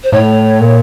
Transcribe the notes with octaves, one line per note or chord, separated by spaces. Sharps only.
C5
A2 C#5
A#2